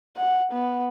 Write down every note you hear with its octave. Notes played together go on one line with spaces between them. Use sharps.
F#5
B3